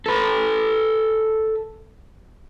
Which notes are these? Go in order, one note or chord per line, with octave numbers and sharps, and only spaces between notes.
A4 B4